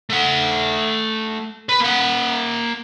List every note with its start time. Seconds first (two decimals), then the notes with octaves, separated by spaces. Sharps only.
0.10 A3 F#5
1.69 B4 B5
1.80 A#3 F#5